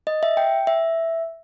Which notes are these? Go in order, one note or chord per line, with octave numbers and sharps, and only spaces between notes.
D#5
E5
G5
E5